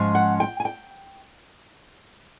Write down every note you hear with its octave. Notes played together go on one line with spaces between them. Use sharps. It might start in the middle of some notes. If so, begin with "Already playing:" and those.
Already playing: G#2 F3 G#3 C#4
F#5
G5
G#5
G5